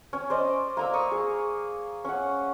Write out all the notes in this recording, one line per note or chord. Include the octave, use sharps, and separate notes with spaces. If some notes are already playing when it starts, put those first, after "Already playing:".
C#4
C5 D5 D#5
A#3 A#5 E6
C#6 D#6
G#4
C#4 F#5